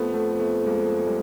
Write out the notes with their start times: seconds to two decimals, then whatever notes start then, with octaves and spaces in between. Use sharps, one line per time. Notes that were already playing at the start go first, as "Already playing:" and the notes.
Already playing: F2 A3 B3
0.13 A3 B3
0.40 A3 B3
0.67 G#3 A#3
1.06 G3 A3